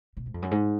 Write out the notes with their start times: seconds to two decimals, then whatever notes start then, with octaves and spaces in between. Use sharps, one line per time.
0.17 B2
0.26 G#2
0.34 F2
0.42 F#2
0.51 G#2